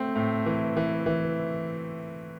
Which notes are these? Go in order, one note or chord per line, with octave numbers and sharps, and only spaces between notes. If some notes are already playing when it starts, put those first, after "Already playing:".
Already playing: A3 C4
A2
E3
E3
E3